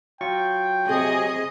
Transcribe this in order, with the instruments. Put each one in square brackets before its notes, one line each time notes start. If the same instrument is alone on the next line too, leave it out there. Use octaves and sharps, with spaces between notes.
[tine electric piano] F#3 F4 C#6 [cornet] G5
[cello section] C3 D#5 [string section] G#4